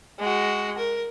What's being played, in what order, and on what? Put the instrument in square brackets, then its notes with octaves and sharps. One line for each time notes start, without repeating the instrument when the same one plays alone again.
[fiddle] G#3 F#4
A#4